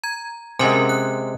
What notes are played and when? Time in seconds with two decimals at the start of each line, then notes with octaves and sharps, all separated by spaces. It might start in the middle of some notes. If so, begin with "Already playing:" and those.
0.04 A#5 G#6
0.59 C3 G#3 C#4 A#4 G#5
0.89 F#6